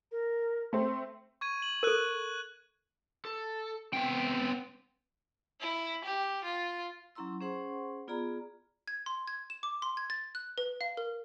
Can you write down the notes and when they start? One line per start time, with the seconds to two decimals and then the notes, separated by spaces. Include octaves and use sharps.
0.12 A#4
0.73 A3 C4 C6
1.41 C#6 G#6 D#7
1.62 F#7
1.83 A4 A#4 F#6 D#7
3.25 A4
3.93 B3 C4 E5 G5
5.60 E4
6.05 G4
6.44 F4
7.15 F#3 C#4 E4 A#5 C6 E6
7.40 C#4 G#4 C5 F#5 C6 C#6
8.08 B3 F4 G#4 D5 A#5 B5
8.88 G#6
9.06 C6
9.27 G#6
9.50 E7
9.63 D6
9.82 C6
9.97 G#6
10.10 A6
10.35 F#6
10.58 B4
10.81 F5
10.97 A#4